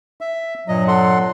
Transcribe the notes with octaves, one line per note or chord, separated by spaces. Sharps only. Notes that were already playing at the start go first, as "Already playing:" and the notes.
E5
G2 A#2 F#3 D#5
A4 F#5 C6